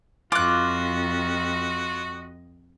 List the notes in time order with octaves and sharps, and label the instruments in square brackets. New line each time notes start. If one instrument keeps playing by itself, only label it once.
[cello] F2 D#5 [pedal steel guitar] F4 [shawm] F#4 [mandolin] D6 F#6